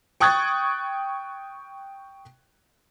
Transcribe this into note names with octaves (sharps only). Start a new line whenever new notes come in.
G5 C#6 D#6 F#6 G#6 A6